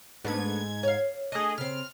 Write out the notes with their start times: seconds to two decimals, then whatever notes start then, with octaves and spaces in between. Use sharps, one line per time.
0.24 G#2 A3 B3 D4 G#6
0.83 C#5 F5
1.32 A3 D4 G#4 D#5
1.58 C#3 C4 F6